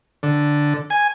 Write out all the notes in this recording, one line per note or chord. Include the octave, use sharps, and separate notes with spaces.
D3
G#5